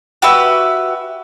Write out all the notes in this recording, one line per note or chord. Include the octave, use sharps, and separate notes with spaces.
F#4 G4 B4 E5